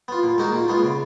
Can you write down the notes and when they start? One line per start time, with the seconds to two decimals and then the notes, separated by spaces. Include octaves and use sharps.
0.08 B3 F4
0.23 A#2
0.38 G#3 D#4 F#4 A#4
0.52 A#2
0.68 G#3 B3 F4
0.83 C#3